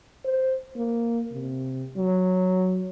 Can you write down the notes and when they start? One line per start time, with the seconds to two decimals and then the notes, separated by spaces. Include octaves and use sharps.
0.25 C5
0.76 A#3
1.32 C3
1.97 F#3